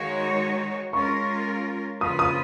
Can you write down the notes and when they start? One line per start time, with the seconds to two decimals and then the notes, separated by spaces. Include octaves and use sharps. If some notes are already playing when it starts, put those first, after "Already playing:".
Already playing: D#3 G#3 D#4 F#4 C#5 F5
0.93 G#3 C#4 F4 A#4 C#6
2.01 C#3 F3 A#3 F4 B4 D#6
2.19 D#6